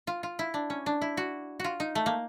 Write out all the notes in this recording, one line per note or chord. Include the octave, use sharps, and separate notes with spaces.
F4
F4
E4
D4
C#4
D4
E4
F#4
F4 F#4
D#4
A3
A#3